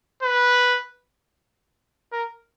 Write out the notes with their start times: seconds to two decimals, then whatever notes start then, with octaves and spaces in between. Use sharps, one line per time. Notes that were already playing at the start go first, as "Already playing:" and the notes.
0.23 B4
2.12 A#4